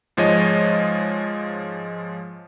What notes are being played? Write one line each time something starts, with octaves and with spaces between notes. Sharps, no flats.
G#2 F3 G#3 C#5 D#5